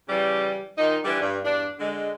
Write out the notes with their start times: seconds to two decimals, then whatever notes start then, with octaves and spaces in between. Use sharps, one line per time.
0.08 C#3 E3 G3
0.78 A#2 D#3 D#4
1.03 D3 E3 G3
1.20 G2
1.43 E2 G2 D4
1.79 D3 G#3